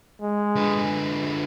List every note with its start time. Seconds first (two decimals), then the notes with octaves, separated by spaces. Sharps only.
0.22 G#3
0.56 D3 B4